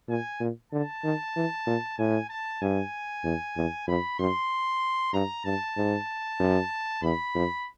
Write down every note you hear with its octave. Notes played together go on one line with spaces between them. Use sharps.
A#2 G#5
A#2
D3 A5
D#3
E3
A#2
A2 G#5
A5
G2 G#5
E2
E2
F2 B5
F#2 C6
G2 A#5
G2 A5
G#2
F#2
E2 B5
F2